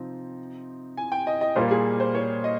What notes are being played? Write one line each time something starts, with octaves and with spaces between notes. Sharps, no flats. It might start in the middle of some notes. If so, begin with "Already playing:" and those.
Already playing: C3 F3 C4 D#4
G#5
G5
D#5
D#5
A#2 G3 A#3 F4 C5
G#4
C5
C#5
D#5